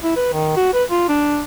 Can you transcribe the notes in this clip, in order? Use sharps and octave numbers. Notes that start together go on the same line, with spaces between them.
E4
B4
D#3
F#4
B4
F4
D4